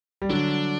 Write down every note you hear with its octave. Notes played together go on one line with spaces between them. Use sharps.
G3
D3 F#3 D4